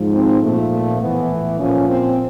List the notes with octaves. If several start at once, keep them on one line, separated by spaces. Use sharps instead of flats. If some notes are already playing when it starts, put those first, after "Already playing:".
Already playing: G#2 F3
C4
A#2 F3 A3
A2 E3 B3
A#2 F3 C#4
C4